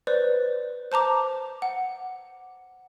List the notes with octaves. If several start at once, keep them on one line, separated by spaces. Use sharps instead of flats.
B4 C5 D5
C5 A5 A#5 D6
F#5